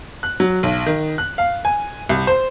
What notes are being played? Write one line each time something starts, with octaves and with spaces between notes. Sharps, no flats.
F#6
F#3
B1
D#3
F#6
F5
G#5
C2
C5